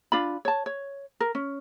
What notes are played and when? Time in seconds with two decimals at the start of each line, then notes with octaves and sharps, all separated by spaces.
0.12 D4 F4 B5
0.45 C#5 A5
0.66 C#5
1.20 A#4
1.35 C#4